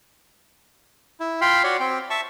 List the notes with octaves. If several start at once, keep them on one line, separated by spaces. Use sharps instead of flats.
E4
F4 F5 G5 B5 C6
F#4 C#5 D5
C4 G5
E5 A5 C#6